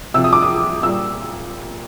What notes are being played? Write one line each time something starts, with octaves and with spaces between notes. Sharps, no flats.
C3 F3 E6
D#6
D6
D#6
A#2 G3 E6